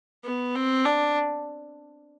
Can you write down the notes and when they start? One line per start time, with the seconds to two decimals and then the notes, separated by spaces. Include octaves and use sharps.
0.24 B3
0.55 C4
0.85 D4